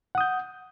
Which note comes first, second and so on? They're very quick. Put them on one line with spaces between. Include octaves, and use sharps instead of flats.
F#5 D#6 G6